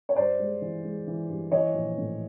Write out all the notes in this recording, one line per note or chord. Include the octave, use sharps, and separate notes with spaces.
C#5
G2 C5 D5
G#3
E3
G#3
E3
G2
E3 C#5 D#5
A#1
A2